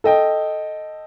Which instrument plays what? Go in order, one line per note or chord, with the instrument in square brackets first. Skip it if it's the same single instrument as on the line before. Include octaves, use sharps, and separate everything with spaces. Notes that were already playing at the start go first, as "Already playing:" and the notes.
[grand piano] A4 D#5 G5